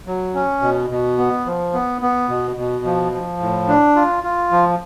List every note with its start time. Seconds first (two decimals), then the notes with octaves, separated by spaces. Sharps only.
0.07 F#3
0.35 C#4
0.62 B2
0.90 B2
1.18 B3
1.46 F3
1.73 B3
2.02 B3
2.29 B2
2.56 B2
2.85 F3
3.12 F3
3.40 A2
3.68 D4
3.96 F4
4.24 F4
4.51 F3